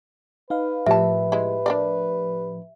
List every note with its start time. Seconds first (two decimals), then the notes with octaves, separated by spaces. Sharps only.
0.50 D#4 B4 F5
0.86 A2 F3 G4 A#4 E5 A5
1.32 G#3 E4
1.66 D4 A#4 D5